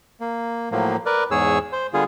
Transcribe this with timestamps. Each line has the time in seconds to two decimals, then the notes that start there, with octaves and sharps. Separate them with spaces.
0.20 A#3
0.72 A2 F3 F#3 A#3
1.06 A#4 B4 D5
1.31 E2 G#2 G#4 C#5 E6
1.72 C5
1.94 D3 G3 B3 F4 G#4